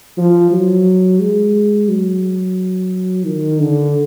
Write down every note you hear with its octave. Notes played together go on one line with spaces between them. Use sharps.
F3
F#3
G#3
F#3
D#3
D3